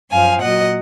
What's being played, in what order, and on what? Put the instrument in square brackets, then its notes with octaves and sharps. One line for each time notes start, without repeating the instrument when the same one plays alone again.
[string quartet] F#2 F3 F5 G#5
A#2 F#3 D#5 F#5